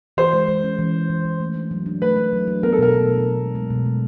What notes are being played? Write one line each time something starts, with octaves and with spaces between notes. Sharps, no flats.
E3 C5
G#3
G#3
C#4
E3
G#3
E3
E3
A3
D4
F#3
D4
A3 B4
A3
F#3
D4
B3 A#4
A4
B2 A#4
B3
B2
B3
G#3
G#3
B2
G#3